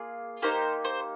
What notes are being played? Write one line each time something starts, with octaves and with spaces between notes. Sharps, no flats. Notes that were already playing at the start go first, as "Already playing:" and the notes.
Already playing: A#3 F4 G#4
A#3 D#4 G4 C5
C5